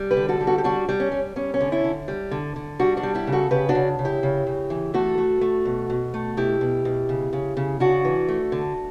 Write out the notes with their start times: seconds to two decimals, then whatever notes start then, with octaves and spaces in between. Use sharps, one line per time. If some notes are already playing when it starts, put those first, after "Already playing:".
Already playing: G3
0.11 G4 B4
0.17 D3
0.29 F#4 A4
0.41 G3
0.47 F#4 A4
0.58 G4
0.64 G3 D4 F#4
0.89 G3
1.00 C#4
1.12 G3
1.36 G3 C#4
1.54 C#4
1.61 D3
1.72 C#4 E4
1.84 D3
2.08 G3
2.31 D3
2.56 D3
2.79 G3 D4 F#4
2.97 D4 F#4
3.03 G3
3.15 E4 G4
3.27 C#3
3.32 F#4 A4
3.51 C#3 G4 B4
3.69 D4 F#4
3.75 C#3
3.99 C#3
4.05 E4 G4
4.23 C#3
4.47 C#3
4.70 E3
4.94 A3 F#4 A4
5.18 A3
5.41 A3
5.65 B2
5.90 B2
6.14 A3
6.37 B2 E4 G4
6.61 B2
6.85 B2
7.09 C#3
7.33 C#3
7.57 C#3
7.80 C#3 D4 F#4
8.05 E3
8.28 A3
8.52 D3